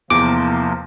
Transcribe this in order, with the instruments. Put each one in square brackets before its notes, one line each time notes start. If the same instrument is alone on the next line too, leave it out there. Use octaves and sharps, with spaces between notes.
[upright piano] E2 [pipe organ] C3 F3 A#3 [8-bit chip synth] D6